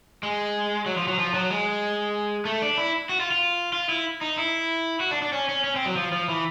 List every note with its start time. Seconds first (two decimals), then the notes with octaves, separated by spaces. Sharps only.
0.23 G#3
0.86 F#3
0.98 F3
1.08 F#3
1.18 F3
1.34 F#3
1.50 G#3
2.45 A3
2.62 D4
2.77 E4
3.09 F#4
3.20 F4
3.31 F4
3.73 F4
3.89 E4
4.21 D#4
4.38 E4
5.00 F#4
5.11 D4
5.22 D4
5.32 C#4
5.49 C#4
5.64 C#4
5.76 C4
5.86 F#3
5.96 F3
6.12 F3
6.29 E3